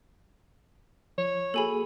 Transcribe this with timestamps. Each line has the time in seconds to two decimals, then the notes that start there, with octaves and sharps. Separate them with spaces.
1.18 F3 C#5
1.54 A#3 F#4 G#4 A4 G#5 B5